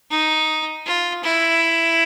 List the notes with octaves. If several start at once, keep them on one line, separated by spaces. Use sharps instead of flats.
D#4
F4
E4